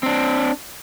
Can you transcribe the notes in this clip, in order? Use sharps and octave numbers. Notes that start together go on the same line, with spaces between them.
C4 D4